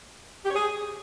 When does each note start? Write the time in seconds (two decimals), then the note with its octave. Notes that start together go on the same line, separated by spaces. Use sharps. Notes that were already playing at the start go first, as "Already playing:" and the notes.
0.45 G4
0.50 C#5
0.55 G#4